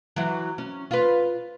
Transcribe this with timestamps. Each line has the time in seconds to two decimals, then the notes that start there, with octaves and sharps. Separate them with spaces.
0.16 E3 F#3
0.58 C#4
0.91 F4 B4